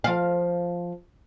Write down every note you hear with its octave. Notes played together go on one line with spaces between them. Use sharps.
F3 F5